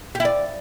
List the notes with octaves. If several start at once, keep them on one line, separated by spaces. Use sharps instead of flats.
G4
E4
D5